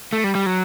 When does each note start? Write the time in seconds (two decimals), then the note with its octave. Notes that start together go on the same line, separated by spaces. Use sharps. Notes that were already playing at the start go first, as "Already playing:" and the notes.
0.13 A3
0.24 G3
0.35 G3
0.46 F#3